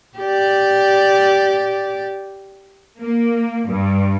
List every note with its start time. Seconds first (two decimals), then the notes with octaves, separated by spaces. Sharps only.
0.19 G4 D5
3.02 A#3
3.68 G2